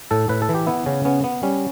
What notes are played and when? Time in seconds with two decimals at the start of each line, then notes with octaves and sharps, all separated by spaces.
0.11 A2 A4
0.29 A2 B4
0.42 A4
0.49 E3
0.55 G4
0.67 B3 E4
0.86 C#3 C#4
1.05 B3 C#4
1.24 B3
1.43 G3 C#4